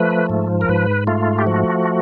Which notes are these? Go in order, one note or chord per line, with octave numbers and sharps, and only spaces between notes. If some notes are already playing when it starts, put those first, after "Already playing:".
Already playing: F3 A3 B4
G#2
A#4
G#2 B4
A3 F4
G4
F3 F#4